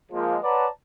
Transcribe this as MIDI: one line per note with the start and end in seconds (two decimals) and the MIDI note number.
0.12 0.37 53
0.12 0.37 56
0.12 0.37 58
0.43 0.67 71
0.43 0.67 73
0.43 0.67 74
0.43 0.67 78
0.43 0.67 81
0.43 0.67 82